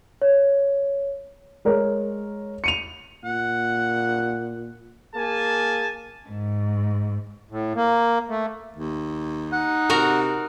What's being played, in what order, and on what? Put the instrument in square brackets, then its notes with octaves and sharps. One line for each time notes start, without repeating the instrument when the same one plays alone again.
[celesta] C#5
[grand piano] G#3 A#4 C#5
C#7 D#7 F7
[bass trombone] A#2 [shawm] F#5
[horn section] A#3 G#4 G#5 A5
[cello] G#2
[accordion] A2
A#3
A3
[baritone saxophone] D#2
[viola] D#4 [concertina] F#5
[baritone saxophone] C3 [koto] F#4 A#4